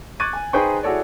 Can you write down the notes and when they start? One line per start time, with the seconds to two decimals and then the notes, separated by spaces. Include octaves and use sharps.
0.20 C#6 D6 F#6 G#6 A6 D#7
0.33 G#5
0.53 D#4 G#4 B4 C5 G5 C#6
0.83 E4 F#4 G#4 A4 C#5 D5